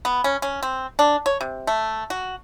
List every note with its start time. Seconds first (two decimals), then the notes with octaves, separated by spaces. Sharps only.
0.05 B3
0.24 C#4
0.42 C#4
0.63 C4
0.99 D4
1.26 C#5
1.41 C3
1.67 A3
2.10 F#4